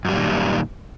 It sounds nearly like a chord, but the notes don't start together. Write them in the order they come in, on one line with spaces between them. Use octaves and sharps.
F#2 G3 A#2 D#3